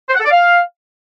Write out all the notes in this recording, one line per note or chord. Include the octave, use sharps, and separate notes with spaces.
C5
F#5
A4
D5
F5